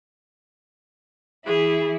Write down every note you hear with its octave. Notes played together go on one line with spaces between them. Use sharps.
E3 E4 G#4